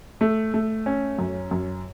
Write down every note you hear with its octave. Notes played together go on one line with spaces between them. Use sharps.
A3
A3
C#4
F#2
F#2